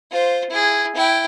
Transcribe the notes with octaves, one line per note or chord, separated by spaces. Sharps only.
F4 C5
E4 G#4
E4 G5